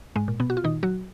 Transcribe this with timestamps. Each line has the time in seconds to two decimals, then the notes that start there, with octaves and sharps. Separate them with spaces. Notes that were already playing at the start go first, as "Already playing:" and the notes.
0.16 G#2 G#3
0.28 A#2
0.40 B2 B3
0.50 F#4
0.57 F4
0.64 A#2 D#3 D#4
0.83 F#3 F#4